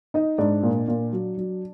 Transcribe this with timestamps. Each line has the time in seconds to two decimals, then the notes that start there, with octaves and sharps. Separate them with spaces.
0.14 D#4 D#5
0.38 G#2 D4 D5
0.63 A#2
0.88 A#2
1.13 F#3
1.37 F#3